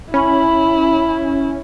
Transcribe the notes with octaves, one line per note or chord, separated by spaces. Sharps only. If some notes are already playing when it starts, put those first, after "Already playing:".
C#4 E4 B5